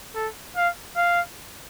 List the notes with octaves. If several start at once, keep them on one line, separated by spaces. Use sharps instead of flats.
A4
F5
F5